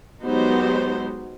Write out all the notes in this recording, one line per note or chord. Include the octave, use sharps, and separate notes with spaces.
F#3 G#3 B3 D#4 G4 C5